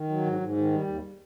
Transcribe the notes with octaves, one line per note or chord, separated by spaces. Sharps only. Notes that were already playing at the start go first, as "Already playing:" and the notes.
Already playing: D#3
F#3
G#2
G#2
D#3
G3
D#2